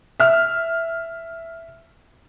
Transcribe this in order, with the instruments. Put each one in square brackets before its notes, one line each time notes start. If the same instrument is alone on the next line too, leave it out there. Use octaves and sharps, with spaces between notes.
[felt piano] E5 F6